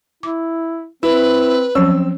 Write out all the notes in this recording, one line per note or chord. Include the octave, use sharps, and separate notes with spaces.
E4 D6
C4 E4 B4
F3 F#3 C4 C#4 E6